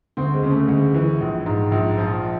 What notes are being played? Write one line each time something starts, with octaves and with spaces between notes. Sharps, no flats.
D2 C4
G#3
C#3
A3
D2 G#3
E3
A#1
G#2
A#1
F3